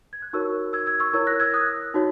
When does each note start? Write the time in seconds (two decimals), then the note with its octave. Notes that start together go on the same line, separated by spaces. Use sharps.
0.13 G#6
0.22 F#6
0.33 D#4 F#4 A#4 C#5 C#6 E6
0.73 E6 G#6
0.87 E6 G#6
1.00 C#6 E6
1.13 E4 A#4 C#5 E6 G#6
1.27 F#6 A#6
1.40 E6 G#6
1.54 D#6 F#6
1.94 D#4 F#4 C#5